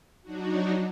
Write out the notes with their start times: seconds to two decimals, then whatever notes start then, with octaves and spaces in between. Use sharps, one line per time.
0.23 F#3 D4 D#4 F#4